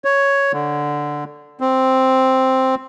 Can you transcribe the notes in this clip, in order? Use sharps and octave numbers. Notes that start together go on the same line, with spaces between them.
C#5
D3
C4